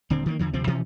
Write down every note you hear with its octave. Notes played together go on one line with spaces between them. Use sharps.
D#1 D3 C4
D#3 E3 G3 A#3
E2 D3 F3
D2 C3 F3 C4
B2 E3 F3 C#4